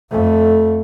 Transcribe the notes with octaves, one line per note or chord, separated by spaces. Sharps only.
F2 A3